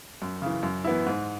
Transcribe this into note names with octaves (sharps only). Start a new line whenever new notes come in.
F#2
C#3 E3
F#2
E3 B3 E4
G#2